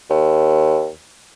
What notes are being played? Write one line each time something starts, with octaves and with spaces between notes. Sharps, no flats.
D#2